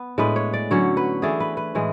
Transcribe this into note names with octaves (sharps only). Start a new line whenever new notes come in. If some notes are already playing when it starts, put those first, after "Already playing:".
Already playing: B3
A2 G#3 D4 B4
C#5
D5
D3 F#3 C#4 C#5
B4
E3 A3 D4 G#4
B4
B4
A2 E3 G#3